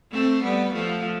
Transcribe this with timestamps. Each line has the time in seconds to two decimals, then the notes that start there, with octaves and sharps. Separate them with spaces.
0.12 A3 C4
0.43 G3 B3
0.73 F3 A3